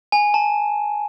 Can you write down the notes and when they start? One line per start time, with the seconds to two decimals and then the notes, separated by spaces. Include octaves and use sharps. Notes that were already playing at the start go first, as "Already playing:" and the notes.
0.12 G#5
0.34 A5